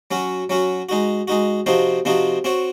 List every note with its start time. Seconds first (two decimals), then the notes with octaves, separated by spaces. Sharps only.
0.11 F#3 C#4 F#4
0.50 F#3 C#4 F#4
0.89 G#3 D#4 F#4
1.28 G#3 D#4 F#4
1.66 C3 F3 C4 D#4 F#4
2.05 C3 F3 C4 D#4 F#4
2.44 C4 F#4 C#5